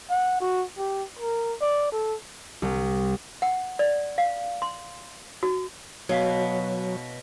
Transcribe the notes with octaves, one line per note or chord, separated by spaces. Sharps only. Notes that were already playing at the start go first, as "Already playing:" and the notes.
F#5
F#4
G4
A#4
D5
A4
C2
F#5
D5
F5
C6
F#4
B2 F#3 C#5 F5 B6